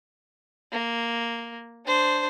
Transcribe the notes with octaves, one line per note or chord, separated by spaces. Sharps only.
A#3
D4 C5